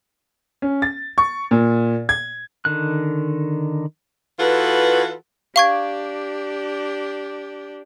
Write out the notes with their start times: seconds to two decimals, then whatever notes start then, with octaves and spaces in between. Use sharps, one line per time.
0.62 C#4
0.82 A6
1.18 C#6
1.51 A#2
2.09 G#6
2.65 D3 D#3 F#6
4.39 E3 F4 F#4 A4 B4
5.56 D4 G4 F5 C#6 G#6